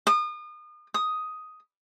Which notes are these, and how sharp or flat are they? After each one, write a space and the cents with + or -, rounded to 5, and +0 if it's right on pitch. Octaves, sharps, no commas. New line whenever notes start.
D#6 -35
D#6 +5